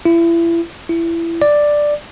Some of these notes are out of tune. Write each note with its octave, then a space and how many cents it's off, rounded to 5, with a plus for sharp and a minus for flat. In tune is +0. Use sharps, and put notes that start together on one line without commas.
E4 +30
E4 +20
D5 +5